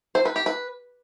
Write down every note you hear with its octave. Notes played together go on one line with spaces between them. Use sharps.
C5
B4
G4
B4